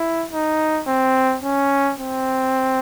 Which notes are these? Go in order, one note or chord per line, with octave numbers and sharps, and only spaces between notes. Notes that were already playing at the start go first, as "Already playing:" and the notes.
Already playing: E4
D#4
C4
C#4
C4